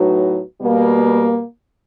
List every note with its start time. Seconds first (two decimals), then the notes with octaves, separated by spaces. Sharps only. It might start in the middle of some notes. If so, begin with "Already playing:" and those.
Already playing: A2 F#3 B3 D#4 F#4
0.61 B2 G3 A#3